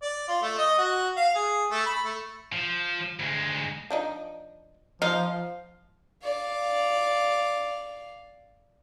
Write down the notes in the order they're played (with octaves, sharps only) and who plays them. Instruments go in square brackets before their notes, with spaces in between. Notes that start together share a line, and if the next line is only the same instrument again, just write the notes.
[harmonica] D5
F4
A3
D#5
F#4
F5
G#4
A3
B5
A3
[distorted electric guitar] F3
D2 G#3
[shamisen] F3 D4 D#4
[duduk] F3 [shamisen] D#4 [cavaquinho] F5
[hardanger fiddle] D5 F5